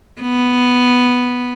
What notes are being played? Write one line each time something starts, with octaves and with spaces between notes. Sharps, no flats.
B3